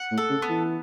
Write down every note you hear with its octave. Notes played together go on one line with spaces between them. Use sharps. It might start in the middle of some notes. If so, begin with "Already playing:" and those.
Already playing: F#5
A2
A4
C#3
B3
E3